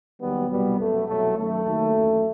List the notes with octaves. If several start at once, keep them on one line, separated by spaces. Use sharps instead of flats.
D#2 D#3 F#3 G3 B3
C2 B2 F#3 G3 B3
F#2 F#3 A3
C2 B2 F#3 A3
F#2 D#3 F#3 A3
D#2 D#3 F#3
F#2 E3